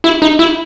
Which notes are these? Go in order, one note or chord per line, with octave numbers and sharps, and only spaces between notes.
E4
D#4
E4